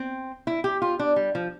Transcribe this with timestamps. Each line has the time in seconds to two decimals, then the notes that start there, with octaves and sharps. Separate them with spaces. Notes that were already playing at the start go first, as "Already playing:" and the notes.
Already playing: C4
0.47 E4
0.64 G4
0.82 F4
0.99 D4
1.16 G3
1.35 F3